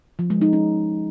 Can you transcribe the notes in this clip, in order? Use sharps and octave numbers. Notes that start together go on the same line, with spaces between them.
F3
G#3
D#4
C#4